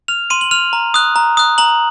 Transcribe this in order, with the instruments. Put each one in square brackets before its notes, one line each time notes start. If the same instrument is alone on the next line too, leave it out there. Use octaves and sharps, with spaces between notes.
[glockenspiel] F6 F7
C6 D#7
F#7
F6 F7
A#5
D#6 F#6
A#5
D#6 F#6
A#5 F#7